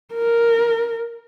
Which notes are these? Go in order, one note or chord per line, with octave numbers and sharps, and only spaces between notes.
A#4